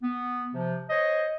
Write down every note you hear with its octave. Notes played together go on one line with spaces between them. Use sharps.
B3
C3 F3
C5 C#5 D#5